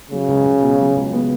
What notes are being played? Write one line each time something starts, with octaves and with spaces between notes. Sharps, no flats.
C#3 F#3
C#2
C#2
B2
F#3
C#2
B3